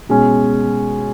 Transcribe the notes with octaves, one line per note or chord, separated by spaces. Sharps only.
B2 G#3 C#4